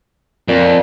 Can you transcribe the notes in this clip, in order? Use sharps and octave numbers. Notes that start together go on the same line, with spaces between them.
F2 A#2